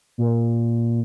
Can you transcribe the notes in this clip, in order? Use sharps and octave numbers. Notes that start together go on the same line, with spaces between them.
A#2